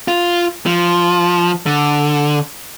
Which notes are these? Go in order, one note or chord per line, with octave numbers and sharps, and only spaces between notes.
F4
F3
D3